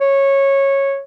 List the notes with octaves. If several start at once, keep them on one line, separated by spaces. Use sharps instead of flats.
C#5